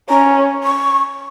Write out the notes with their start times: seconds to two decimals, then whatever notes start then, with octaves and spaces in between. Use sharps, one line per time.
0.09 C#4 A#5
0.64 C#6